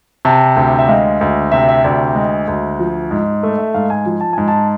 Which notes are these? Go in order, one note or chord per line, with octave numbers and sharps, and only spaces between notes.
C3 A5
D2
E5
G#3 F5
D2
C3 E5
E5
D2 D5
G#3
D2
F3
G#2
A3
E5
G#2 F5
G#5
F3
A5
G#2 G#5
A5